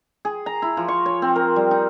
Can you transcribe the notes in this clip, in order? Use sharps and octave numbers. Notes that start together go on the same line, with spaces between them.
G#4
A#5
E4
F3
C#6
C#5
C4
A#4
G3
D#4